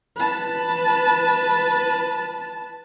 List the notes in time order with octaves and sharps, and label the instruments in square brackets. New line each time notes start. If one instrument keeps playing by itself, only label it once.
[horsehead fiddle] B4 A5